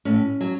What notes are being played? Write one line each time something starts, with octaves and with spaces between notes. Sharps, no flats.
A2 C#4
F#3